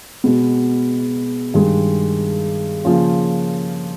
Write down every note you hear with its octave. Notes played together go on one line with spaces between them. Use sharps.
B2 G#3 B3
G2 D#3 G#3
C#3 F3 A#3 C#4 F4